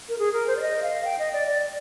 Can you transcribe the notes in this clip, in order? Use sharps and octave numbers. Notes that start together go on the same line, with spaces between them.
A#4
G#4
A#4
C5
D5
D#5
F5
G5
D#5
D5
D5